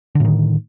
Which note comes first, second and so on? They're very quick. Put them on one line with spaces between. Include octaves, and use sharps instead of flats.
D3 A2 D#3